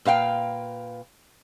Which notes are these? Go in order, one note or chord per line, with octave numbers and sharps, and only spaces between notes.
A#2 B4 F5 G5